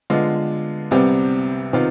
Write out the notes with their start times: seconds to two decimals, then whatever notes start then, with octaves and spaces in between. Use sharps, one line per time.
0.10 D3 G#3 B3 F4
0.91 C2 C3 G3 B3
1.73 C3 D#3 B3 F4